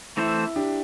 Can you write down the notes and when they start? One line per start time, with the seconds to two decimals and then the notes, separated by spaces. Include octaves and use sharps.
0.17 E3 A3 C4 E4 A4 C5
0.56 D4 G4